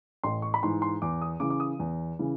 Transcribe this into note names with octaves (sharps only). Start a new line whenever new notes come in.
A1 C6
C#6
B5
G#2 E3 C6
C6
E2 D6
D#6
C#3 E3 D6
D6
D#6
E2
C#3 E3